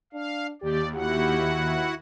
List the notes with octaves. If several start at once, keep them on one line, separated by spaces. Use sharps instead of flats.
D4 F5
D#2 G4 D5
E4 F#4 G4 F#5